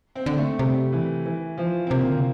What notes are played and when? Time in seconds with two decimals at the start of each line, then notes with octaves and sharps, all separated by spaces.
0.15 C4
0.26 D3
0.38 A3
0.59 C3 G3
0.92 E3
1.26 E3
1.58 F3
1.87 C4
1.90 C3 A#3
2.03 D3
2.16 C3